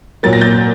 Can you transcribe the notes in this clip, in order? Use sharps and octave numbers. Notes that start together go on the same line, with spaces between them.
A#2 F#3 A#3 A6
A#6
G6 A6